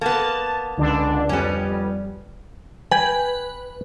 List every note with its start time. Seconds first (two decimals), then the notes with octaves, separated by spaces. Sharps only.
0.01 A#3 B3 A5
0.77 C#2 D3 D4
1.29 F2 G3 B3 C#4
2.91 B4 G5 G#5